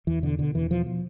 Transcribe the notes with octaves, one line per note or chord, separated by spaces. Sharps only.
E2 E3
B2 D3
B2 D3
E2 E3
B2 F3
F3